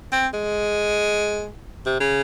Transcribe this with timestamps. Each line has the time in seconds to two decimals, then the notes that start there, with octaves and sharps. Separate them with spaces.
0.13 C4
0.34 G#3
1.86 C3
2.00 C#3